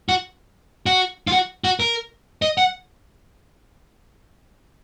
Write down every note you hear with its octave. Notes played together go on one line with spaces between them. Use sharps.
F#4
F#4
F4
F#4
F#4
A#4
D#5
F#5